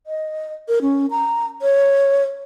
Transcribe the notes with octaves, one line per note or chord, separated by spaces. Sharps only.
D#5
A#4
C#4
A#5
C#5